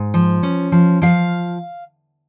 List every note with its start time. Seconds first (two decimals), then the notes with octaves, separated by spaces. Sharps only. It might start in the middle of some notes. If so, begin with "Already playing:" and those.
Already playing: G#2
0.14 F3
0.43 C#4
0.72 F3
1.02 F3 F5